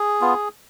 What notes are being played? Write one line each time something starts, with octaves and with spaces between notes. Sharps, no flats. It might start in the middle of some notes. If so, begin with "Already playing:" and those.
Already playing: G#4
B3 F4